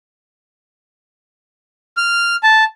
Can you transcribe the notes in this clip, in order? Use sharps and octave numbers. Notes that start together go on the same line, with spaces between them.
F6
A5